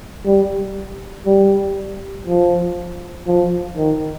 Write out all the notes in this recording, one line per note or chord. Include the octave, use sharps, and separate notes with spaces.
G3
G3
F3
F3
D#3